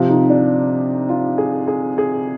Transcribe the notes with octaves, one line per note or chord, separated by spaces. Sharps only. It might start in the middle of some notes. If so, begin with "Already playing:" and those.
Already playing: C3 F3 F4
D#4
D4
F4
G#4
G#4
G#4